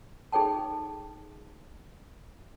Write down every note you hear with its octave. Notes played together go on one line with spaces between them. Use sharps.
D#4 G#4 A4 C#5 G5 A5